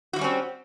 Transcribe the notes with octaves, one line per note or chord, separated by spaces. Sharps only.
F3 G3 C4 C#4 F#4